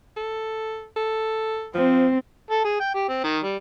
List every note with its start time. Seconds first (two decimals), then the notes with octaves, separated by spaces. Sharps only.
0.16 A4
0.96 A4
1.74 F3 C4
2.50 A4
2.64 G#4
2.80 G5
2.95 G4
3.09 C4
3.24 D#3
3.44 G3